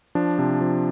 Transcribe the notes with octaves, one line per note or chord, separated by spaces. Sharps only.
F3 D4
C3
F3